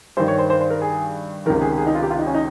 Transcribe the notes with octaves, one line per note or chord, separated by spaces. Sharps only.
G2 D#3 C5
C#5
C5
C5
C5
A#4
G#4
C#2 C3 D#3 A#4
G#4
G#4
D#4
F4
G4
F4
D#4
C#4
D#4